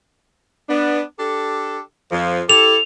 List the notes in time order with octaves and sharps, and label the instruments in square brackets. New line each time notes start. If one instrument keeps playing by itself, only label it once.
[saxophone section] B3 D4
D4 G4 A4
F2 F3
[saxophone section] E4 G4 A4 [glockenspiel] F7